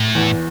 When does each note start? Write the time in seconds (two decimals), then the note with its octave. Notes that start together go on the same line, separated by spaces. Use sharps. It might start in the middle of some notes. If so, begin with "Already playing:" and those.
Already playing: A2
0.15 E2 E3